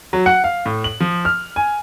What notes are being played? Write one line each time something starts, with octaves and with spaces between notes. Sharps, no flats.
F#3
F#5
F5
A2
F#7
F3
F6
G#5